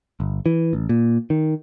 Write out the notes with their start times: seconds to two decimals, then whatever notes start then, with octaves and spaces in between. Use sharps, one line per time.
0.20 G1
0.46 E3
0.73 A1
0.89 A#2
1.30 D#3